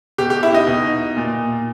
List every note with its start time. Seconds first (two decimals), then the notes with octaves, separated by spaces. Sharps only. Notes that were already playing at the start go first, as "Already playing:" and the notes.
0.18 B2 G4
0.30 G4
0.43 E4
0.54 D#4
0.67 B2
1.17 A#2